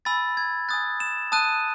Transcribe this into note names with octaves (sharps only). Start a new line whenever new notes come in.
G#5 B5 E6 A6
G#6
G#5 D#6 F#6 A6
E7
A5 D#6 F#6 D#7